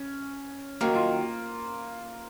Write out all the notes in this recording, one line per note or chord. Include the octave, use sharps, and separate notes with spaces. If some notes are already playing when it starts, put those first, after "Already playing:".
Already playing: C#4
D#2 D#3 F#3 A#3
F4